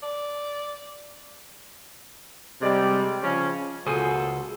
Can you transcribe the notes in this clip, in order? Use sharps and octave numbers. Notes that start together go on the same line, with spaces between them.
D5
C3 G3 G#3 D5
C#3 F3 C#4
C#2 A#2 F#4 G#4 A4 C5 D#6